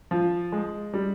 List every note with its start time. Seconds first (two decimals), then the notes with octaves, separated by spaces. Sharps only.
0.11 F3
0.52 G#3
0.94 G3